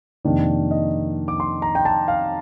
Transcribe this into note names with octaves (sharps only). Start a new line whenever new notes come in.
F2 C3 D#3 A#3 D4
D#5
D6
C6
A#5
G5
A5
F5